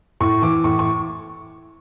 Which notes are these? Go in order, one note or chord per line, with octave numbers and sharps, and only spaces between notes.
A2 C#6
E3 D6
A2 C#6
C#6